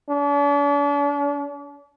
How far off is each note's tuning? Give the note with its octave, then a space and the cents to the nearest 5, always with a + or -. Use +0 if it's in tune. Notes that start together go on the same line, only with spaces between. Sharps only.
D4 -45